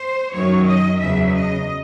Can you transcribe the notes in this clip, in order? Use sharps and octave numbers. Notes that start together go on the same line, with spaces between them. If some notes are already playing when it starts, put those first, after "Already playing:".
Already playing: C5
F#2 D#3 F#3 C#5
D#5
E2 C#3 F#3 E5
D#5